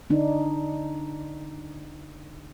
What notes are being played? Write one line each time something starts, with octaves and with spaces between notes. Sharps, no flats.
D3 D4 D#4